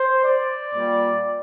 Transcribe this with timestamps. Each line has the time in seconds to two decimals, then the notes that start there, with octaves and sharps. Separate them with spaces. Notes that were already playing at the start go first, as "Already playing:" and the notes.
Already playing: C5
0.25 D5
0.74 A#2 G3